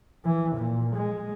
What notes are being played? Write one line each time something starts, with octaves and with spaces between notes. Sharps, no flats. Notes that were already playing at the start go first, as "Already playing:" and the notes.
E3
A#2
G#3